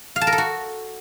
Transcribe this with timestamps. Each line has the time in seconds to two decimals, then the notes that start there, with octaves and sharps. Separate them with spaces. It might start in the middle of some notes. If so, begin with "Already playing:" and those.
0.16 F5
0.21 A5
0.27 A#4
0.32 A4
0.38 F#4